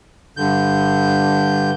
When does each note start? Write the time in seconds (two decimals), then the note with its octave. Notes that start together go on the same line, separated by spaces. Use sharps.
0.37 G2 D3 G6